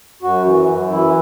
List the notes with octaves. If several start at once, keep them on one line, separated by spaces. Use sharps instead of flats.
F#2 F#4
E3
F#2
E3 E4